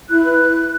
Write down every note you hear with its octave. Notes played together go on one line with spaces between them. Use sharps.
E4 F#6
B4